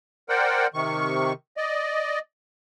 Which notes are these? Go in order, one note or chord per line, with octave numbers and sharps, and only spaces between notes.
A#4 C5 D5 F#5 G5
C3 D#3 C#6
D5 D#5